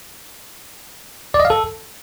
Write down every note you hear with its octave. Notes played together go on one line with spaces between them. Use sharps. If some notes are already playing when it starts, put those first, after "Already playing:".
D5
D#5
F5
A4